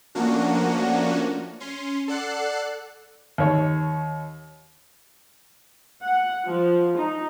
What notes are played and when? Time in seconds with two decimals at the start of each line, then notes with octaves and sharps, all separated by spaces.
0.15 F3 A3 A#3 C#4 D4 F#4
1.60 C#4 C6
2.08 A4 D5 F#5 F#6 C7
3.38 D#2 C#5
6.03 F#5
6.47 F3
6.96 D#4